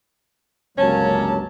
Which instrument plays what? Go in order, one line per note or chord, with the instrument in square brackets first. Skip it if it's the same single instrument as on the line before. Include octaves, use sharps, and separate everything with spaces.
[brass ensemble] G1 C#2 A#3 [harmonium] F#3 [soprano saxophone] C#4 [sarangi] A5